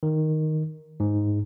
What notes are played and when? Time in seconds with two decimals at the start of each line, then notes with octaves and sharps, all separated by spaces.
0.03 D#3
1.00 G#2